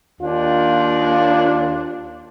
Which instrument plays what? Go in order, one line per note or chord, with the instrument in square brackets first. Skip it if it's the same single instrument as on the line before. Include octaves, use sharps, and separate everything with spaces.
[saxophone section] D#2 D4 [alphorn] F4